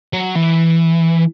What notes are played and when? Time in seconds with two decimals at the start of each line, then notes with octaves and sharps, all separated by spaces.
0.13 F#3
0.36 E3